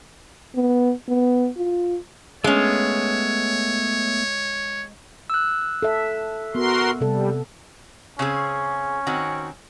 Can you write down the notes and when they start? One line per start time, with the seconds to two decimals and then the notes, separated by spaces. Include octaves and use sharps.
0.55 B3
1.08 B3
1.57 F4
2.44 G#3 A3 B3 C#4 C#5
5.30 E6 F#6
5.82 A4 E5
6.55 B3 F#4 A#4 C6
7.01 C3 G3 A4
8.19 C#3 C4 C#4 G#4
9.07 D#3 C4 F#4